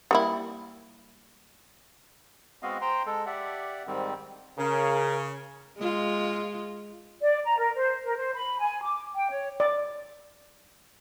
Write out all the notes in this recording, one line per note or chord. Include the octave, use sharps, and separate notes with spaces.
G3 A#3 E4
G#3 B3 C4 F#4 D#5 F5
C5 G5 A#5 C6
G#3 A4
G4 D5 E5 F#5
G#2 D#3 G3 C4
C#3 A#4
G#3 F4
D5
A#5
A#4
C5
A#4
C5
B5
G#5
D6
G5
C#5
D5